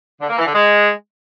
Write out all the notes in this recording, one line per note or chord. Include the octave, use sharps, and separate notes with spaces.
D3
A#3
E3
D3
G#3